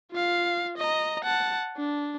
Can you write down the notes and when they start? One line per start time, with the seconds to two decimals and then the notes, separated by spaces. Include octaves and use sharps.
0.11 F4 F5
0.77 D#5 A#5
1.24 F#5 A5
1.77 D4